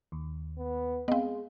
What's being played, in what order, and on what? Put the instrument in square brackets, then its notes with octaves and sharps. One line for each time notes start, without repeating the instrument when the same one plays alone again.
[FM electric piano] D#2
[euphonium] B3
[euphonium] G#3 [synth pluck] B3 C4 [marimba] D#5 F5